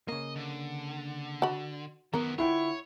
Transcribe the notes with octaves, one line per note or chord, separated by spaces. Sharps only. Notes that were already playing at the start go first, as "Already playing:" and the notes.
C#3 A#3 D#5
D3
F#4 B5
F#2 D#3 E3 B3 A#4
D3 E4 F4 C#5 F#5 G5 B5